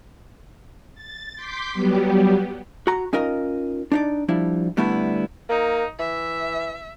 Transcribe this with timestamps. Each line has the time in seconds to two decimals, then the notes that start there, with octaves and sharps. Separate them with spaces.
0.95 A6
1.36 C6 D6 G6 B6
1.73 F#3 G3 B3 G4
2.87 F#4 A#5
3.13 C#4 D#4 F4 A#4 D#5
3.92 D4 D#4 D5
4.28 F3 G3 D4 E4
4.77 D3 G3 A3 B3 E4
5.49 A#3 D#4
5.99 E3 E5